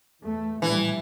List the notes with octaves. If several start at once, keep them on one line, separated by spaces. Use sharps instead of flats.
E2 A3
A#1 A2 E3 G3